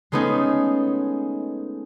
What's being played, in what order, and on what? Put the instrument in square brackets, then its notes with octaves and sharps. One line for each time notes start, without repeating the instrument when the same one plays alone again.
[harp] G#3 A3 B3 C#4 D#4 G#4